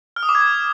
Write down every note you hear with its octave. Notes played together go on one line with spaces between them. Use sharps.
F6
D#6
D6
G#6